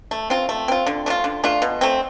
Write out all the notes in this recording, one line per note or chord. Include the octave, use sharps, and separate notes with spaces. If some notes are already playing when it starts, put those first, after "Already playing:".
A3
C4 F4
A3
C4 F4
D3
A3 D4 F4
D3
A3 D4 F4
B2
A3 C4